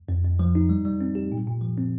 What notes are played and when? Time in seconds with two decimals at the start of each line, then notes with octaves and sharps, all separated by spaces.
0.09 F2
0.24 F2
0.39 F3
0.55 D#4
0.69 G3
0.85 G3
1.01 C4
1.15 G4
1.32 A#2
1.47 A#2
1.61 F3
1.78 C4